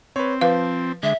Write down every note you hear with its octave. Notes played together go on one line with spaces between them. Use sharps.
C4 B4 C#5
F3 B4 F5
D3 G#3 E5